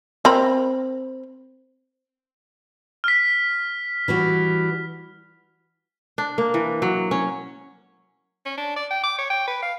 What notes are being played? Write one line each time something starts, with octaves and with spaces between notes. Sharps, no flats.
C4 A#4 B5
F6 B6
E3 G3 F#4
D4
A#3
E3
F#3
C#4
C#4
D4
D5
G5
D6
C#5
G5
B4
F5